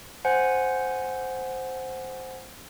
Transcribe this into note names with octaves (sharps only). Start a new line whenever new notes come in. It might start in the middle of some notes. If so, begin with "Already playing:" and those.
C5 F#5 G#5